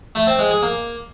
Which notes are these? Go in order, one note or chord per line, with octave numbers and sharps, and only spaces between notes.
A3
C4
G#3
G#4
A#3